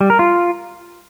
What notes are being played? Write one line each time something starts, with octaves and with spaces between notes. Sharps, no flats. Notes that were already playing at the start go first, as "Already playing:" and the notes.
G3
A#4
F4